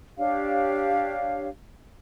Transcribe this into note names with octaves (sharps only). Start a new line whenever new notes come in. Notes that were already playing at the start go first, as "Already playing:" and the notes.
D4 G4 C#5 F5